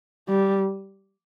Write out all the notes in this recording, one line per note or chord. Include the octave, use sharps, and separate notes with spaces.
G3